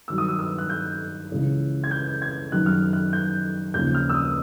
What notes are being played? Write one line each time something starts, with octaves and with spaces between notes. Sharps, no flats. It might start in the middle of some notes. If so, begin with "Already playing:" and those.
G2 D#3 F#3 E6
D#6
E6
E6
F#6
G6
C#2 C#3 E3
G#6
G6
G#6
F#2 D#3 G3 F#6
F6
F#6
F#6
G6
D#2 C#3 F3 G6
F6
E6
D#6